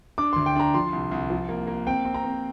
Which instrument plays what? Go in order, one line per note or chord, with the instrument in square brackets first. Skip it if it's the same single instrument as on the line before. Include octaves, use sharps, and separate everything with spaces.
[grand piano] D4 D6
D2 C6
G5
D4 A#5
F3 C6
C2
C2
F3
A#3
A#3
C4 G5
C4
A#5
C4